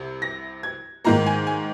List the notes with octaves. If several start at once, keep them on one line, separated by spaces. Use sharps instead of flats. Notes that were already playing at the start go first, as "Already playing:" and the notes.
Already playing: C2 C3
A#6
G#6
G#2 D#3 A#3 A#5
G#5
G#5